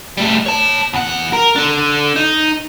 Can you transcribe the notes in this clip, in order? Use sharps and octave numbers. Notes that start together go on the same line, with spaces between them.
G3 A3
C#5 A5
E2 F#5
A#4
D4 A4
D#4